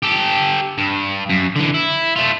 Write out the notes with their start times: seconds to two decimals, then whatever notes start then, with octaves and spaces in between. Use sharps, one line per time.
0.03 G4 A4
0.78 G2
1.30 F#2
1.56 D3 E3
1.74 E4
2.16 A3 F4